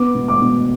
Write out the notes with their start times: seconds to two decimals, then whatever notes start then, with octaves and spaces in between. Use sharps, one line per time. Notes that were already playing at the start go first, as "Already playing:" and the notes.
Already playing: B3 D6
0.15 B2
0.28 D6
0.41 B2